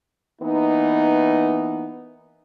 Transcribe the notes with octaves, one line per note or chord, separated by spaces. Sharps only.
E3 A#3 B3 D#4